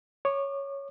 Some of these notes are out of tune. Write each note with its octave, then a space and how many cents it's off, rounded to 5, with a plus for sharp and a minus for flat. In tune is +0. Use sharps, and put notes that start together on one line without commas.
C#5 +0 D6 +40